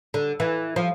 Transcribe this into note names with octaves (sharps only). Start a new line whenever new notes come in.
D3
E3
F3